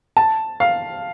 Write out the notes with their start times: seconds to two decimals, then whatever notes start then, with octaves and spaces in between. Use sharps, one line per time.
0.17 A5
0.60 F5